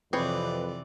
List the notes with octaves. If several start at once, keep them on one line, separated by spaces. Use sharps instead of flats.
F2 C3 E3 C4 G#4 B4 C#5 D5